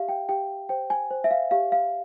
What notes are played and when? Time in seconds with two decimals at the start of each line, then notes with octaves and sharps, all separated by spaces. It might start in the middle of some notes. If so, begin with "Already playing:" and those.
Already playing: G4 E5 F5
0.09 G5
0.29 G4 G5
0.69 C5 G5
0.90 G#5
1.11 C5
1.24 E5
1.31 F5
1.51 G4 F5
1.72 F5